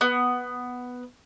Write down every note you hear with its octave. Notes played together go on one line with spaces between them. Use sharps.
B3